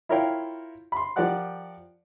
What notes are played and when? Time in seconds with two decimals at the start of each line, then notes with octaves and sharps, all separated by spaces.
0.09 E4 F4 A#4 C#5 F5 G5
0.92 B5 C6
1.16 F3 G4 A#4 D5 F#5 F#6